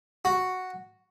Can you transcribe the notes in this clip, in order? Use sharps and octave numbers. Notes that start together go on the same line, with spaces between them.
F#4